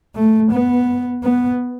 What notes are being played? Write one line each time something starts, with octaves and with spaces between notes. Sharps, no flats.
A3
B3
B3